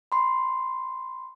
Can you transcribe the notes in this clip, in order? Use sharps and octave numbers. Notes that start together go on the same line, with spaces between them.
B5 C6